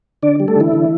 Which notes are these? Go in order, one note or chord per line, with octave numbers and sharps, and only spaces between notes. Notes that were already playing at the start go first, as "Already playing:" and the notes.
D3 D4 D5
G3
A3 A4
D3 E3 E4
D3